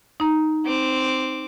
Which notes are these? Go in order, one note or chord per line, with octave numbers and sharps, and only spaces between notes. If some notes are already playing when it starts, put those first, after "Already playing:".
D#4 A#5
C4 D6